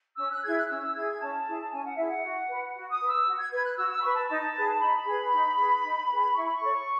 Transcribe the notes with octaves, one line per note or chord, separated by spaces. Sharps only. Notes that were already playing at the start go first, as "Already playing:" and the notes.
C#4 E6
F#6
E4 G#4 G#6
F#6
C#4 E6
E6
E4 G#4 G#6
G#6
C#4 A5
E4 G#4
C#4 G#5
F#5
E4 G#4 E5
F#5
F#4
B4
F#4
D#6
B4
E6
F#4
G#6
B4 G#6
F#6
F#4 E6
E6
B5
B4 C#6
A5
D#4 A5
G#4 B4
D#4 B5
G#4 B4
D#4
G#4 B4
D#4
G#4 B4
E4 C#6
B5
C#6
A4 C#5